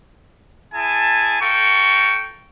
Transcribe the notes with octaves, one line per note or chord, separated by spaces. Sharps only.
E4 G#4 G#5 A5
F4 A4 G5 A#5 C#6